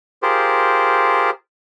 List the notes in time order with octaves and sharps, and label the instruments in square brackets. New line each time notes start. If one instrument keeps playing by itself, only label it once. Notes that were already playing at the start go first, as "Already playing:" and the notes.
[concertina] F4 G4 G#4 A#4 C5